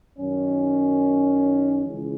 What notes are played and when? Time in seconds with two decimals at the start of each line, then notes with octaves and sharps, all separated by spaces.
0.19 F#2 D#3 C#4
1.86 C#2 C#3 E3